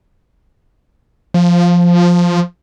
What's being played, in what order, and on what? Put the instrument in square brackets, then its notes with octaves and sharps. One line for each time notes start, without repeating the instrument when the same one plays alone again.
[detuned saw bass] F3